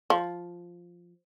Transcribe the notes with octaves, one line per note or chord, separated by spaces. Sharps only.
F3